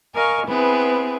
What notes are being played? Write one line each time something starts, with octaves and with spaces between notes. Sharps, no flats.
A#4 D#5 F5 G#5 C#6
B3 C4 E4 G#4 B4